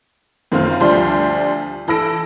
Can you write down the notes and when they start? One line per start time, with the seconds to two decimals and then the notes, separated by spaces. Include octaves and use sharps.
0.52 F#2 D#3 C4 F4 F5 F6
0.80 D2 F3 G3 C6 G6
1.88 E3 A4 B5 E6 A#6 D7